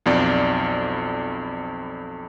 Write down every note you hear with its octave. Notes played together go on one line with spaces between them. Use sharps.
B1 F2 D5